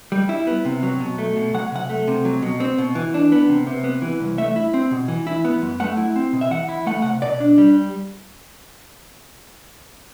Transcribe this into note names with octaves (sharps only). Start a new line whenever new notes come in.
G3
E4
B3
C3
F#3
B2
A3
B2
F#3 F#5
C3 F#5
A3
C3
F#3
B2
C4
B2
E3
D4
B3
C3
C3
B3
E3
C2
A3 E5
E4
C4
B2
E3
E4
B3
F#2
A3 F#5
E4
C4
B2
E5
E3 F#5
E4
A3 F#5
C3 F#5
B2 D5
D4
G3